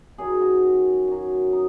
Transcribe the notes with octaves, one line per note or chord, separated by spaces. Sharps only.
F#2 D#3 F#3 G#4
F#4
F#2 F#3
D#4